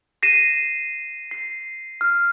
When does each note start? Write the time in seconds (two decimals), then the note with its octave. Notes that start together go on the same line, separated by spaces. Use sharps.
0.23 A#6 C7 D#7 E7
1.31 C7
2.01 F6